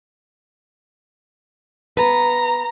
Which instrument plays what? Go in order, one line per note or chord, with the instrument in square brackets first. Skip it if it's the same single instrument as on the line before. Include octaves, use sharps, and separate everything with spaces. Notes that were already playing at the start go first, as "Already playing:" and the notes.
[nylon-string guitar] B3 B4 [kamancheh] A#5